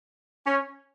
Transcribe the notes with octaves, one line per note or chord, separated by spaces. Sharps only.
C#4